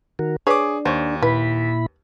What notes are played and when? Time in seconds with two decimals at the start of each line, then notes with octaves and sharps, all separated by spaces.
0.19 D#3 F#4 A#4
0.47 D4 G#4 B4 C#5 D6
0.85 D#2 C5 C#5
1.23 A#2 E4 B4 B5